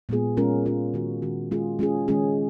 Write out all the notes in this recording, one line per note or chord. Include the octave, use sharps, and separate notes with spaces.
A#2 G#3 B3 F4 G#4
G#3 C#4 F4 A#4
G#3 C#4 F4 A#4
D#3 G#3 C#4 F#4
D#3 G#3 C#4 F#4
G#3 C#4 F4 G#4
G#3 C#4 F4 G#4
D#3 G#3 C#4 G#4